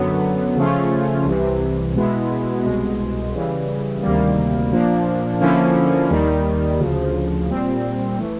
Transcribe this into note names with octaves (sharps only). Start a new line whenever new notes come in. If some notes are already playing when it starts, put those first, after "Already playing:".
Already playing: F#2 D3 F#3 B3
C#3 F3 A3 C#4 F4
C2 C3 E3
B2 G#3 B3 E4
C2 B2 G#3
C#3 E3 G3
D2 C3 D#3 G3 A#3
A#2 F3 A#3 D4
D3 F3 A#3 C#4 E4
D#2 D#3 G3
D2 C#3 F3
A#2 G3 C4
E3 A3